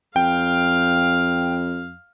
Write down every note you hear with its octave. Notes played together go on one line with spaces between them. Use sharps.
F2 F5 G5